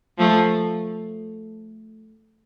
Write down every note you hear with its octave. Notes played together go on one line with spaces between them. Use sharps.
F3 A3